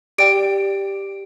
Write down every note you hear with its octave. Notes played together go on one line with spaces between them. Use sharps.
G4 D5 G5 D7